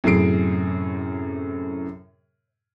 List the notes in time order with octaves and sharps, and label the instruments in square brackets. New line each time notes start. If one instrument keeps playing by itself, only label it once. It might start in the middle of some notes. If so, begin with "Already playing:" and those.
[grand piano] F#2 A2 C3 G#4 C7 D7